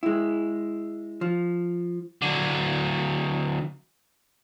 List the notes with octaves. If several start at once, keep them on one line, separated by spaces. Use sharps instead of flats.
G#3 E4
F3
D3 F#3